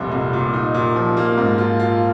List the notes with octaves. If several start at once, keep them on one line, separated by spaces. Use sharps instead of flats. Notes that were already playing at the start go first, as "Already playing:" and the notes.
Already playing: F1 C2 A#2
C2
A#2
D#4
A#2
F3
A#3
G#2
F4
F4